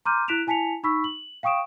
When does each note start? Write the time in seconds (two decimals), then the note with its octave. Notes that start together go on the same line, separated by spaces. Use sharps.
0.05 A#5 C6 D6 F6 G6 D#7
0.28 E4 F#6 B6 D7 E7 F7
0.47 E4 G#5 A5 B6 C#7 F7
0.83 D#4 B5 C#6 E6 B6
1.04 F#7
1.43 F5 G5 C#6 D#6 D7 E7